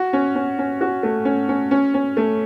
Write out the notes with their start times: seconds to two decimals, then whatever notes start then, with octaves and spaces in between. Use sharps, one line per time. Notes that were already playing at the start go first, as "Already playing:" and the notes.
Already playing: F#4
0.13 C#4
0.35 C#4
0.59 C#4
0.81 F#4
1.03 A3
1.25 C#4
1.49 C#4
1.71 C#4
1.94 C#4
2.17 A3